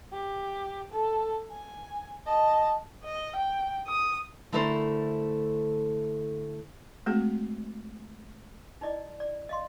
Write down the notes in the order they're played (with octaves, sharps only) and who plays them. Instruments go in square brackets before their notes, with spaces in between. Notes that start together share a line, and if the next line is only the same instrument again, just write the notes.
[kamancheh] G4
A4
G#5
D#5 A5
D#5
G5
D#6
[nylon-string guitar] D3 A3 E4 A4 A#4 C5
[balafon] G#3 A3 C4 F#4 G#4
[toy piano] D#4 E4 D5 D#5
D5
D#5 F5 C6